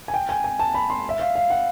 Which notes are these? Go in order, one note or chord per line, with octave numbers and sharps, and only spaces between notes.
G#5
G5
G#5
G#5
A5
B5
C6
E5
F5
F5
F#5